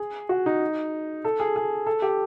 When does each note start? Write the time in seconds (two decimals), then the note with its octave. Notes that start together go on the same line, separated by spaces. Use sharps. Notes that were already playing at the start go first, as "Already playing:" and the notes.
Already playing: G#4
0.29 F#4
0.46 D#4
1.25 A4
1.40 G#4
1.56 G#4
1.86 A4
2.02 G4